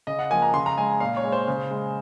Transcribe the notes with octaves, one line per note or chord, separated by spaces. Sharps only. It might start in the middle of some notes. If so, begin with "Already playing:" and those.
C#3 D#5
F#5
F3 A#3 G#5
A#5
C#3 C6
A#5
G#3 G#5
A#2 F5
C#5
G#3
C5
C#3
G#3